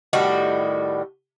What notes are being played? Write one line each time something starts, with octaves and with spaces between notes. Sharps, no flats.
A2 D#3 G3 F#4